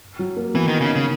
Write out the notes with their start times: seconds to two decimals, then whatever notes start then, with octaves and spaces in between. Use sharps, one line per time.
0.19 F#3
0.36 A#3
0.55 E3 B3
0.68 D#3
0.81 C#3 D#4
0.95 C#3